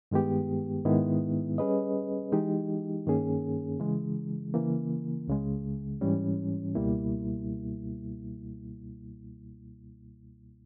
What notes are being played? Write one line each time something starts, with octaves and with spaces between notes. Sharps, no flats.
G2 D#3 G#3 B3 G4
G#2 D#3 G#3 B3 E4
G3 C#4 G#4 B4 D#5
E3 G#3 D#4 G4
G2 D#3 A#3 C#4 G#4
C#3 E3 G#3
C#3 E3 A#3
C#2 C#3 G#3
G#2 E3 G3 C#4
C#2 B2 G3 A#3 E4